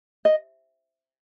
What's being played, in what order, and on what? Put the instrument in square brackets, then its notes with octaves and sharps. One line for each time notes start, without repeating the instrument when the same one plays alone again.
[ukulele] D#5